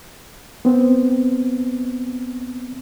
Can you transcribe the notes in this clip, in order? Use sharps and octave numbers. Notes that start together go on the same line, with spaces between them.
B3 C4